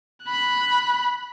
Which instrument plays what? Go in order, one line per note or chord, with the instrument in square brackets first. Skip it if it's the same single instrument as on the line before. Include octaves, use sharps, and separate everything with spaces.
[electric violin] B5 F#6